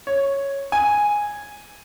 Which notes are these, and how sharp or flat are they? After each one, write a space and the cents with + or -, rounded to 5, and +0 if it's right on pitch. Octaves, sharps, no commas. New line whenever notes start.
C#5 -5
G#5 -5